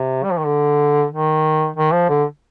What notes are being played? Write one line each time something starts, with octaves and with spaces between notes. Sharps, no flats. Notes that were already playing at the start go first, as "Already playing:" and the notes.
Already playing: C3
G3
F3
D#3
D3
D#3
D#3
F3
D3